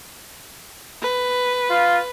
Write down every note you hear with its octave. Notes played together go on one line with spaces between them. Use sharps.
B4
F4